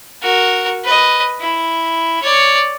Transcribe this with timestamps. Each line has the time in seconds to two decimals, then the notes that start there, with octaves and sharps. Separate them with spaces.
0.22 F#4 A#4
0.84 B4 D#5
1.41 E4
2.22 C#5 D5